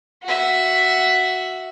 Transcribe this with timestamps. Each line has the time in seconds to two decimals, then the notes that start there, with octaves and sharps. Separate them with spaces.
0.23 F#4 E5